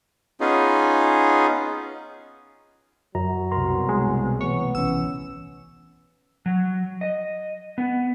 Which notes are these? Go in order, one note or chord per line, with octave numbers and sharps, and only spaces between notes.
B3 C#4 D#4 F4 G#4
F#2 F#3 A#5
C2 B2 A#4 A#5 C6
G#3
E3 A3 B3 C#5
A1 E3 C#4 E6
F#3
D#5
B3